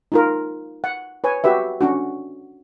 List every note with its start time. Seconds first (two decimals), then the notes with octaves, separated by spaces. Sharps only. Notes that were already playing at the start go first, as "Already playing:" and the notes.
0.12 D#4 F4 A#4
0.84 F#5
1.24 B4 C#5 G#5
1.44 F#4 G4 B4 E5
1.81 C#4 D4 F#4